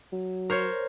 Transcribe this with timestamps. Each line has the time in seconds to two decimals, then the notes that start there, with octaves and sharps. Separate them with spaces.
0.13 F#3
0.50 A#4 C5 C#5